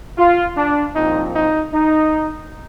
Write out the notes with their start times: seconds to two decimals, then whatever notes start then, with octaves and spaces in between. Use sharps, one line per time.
0.18 F4
0.56 D4
0.95 C2 A#2 F3 C4 D#4
1.34 D#4
1.73 D#4